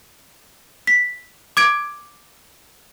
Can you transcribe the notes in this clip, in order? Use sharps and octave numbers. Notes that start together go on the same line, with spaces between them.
B6
D6 G#6 D7